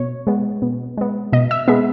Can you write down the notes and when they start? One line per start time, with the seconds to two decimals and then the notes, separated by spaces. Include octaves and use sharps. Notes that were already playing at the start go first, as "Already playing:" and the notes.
Already playing: B2 C#5
0.27 G#3 B3
0.62 B2
0.97 G#3 B3
1.33 B2 D#5
1.51 E5
1.68 G#3 B3 E5